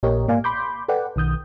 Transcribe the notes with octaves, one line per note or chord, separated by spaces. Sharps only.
A#1 A#2 G4 A#4 C#5 D#5
G#2 A#3 D5 F5 G#5
B5 C6 D6 G6
A4 B4 D5 F#5 G5
B1 D#3 D#6 G6